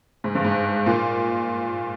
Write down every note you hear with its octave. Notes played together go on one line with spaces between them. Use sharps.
G#2
G2
G#2
A#2